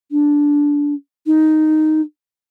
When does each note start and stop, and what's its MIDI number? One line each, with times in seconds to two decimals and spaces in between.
0.11 0.93 62
1.26 2.01 63